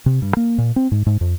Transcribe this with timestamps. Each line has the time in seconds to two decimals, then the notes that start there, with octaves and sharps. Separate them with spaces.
0.06 C3
0.22 G2
0.37 A#3
0.58 A#2
0.76 C4
0.92 G#2
1.06 G#2
1.21 F2